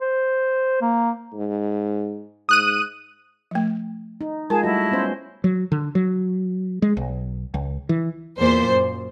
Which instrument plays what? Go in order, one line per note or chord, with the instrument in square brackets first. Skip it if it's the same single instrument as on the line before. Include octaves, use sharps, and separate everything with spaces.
[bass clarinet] C5
A#3
[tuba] G#2
[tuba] G#2 [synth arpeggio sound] D#6 F#6 D#7
[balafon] F3 A3
[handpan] D#4
[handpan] G#3 F4 [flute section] G#4 G#5 A5 [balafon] A#4
[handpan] G3 A3 F#4 [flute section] E4 D#5 A5
[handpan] B3 C#4 C5
[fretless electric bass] F#3
D3
F#3
G#3
B1
C#2
E3
[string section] E2 A#2 C5
F#2